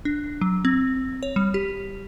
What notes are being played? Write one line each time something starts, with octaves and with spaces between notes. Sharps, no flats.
D4
F#3
C4
C#5
G3
G4